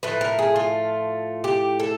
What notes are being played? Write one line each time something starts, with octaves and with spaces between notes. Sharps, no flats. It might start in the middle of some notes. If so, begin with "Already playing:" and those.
A2 F3 A3 B4
A#4
G#4
F4
G4
A4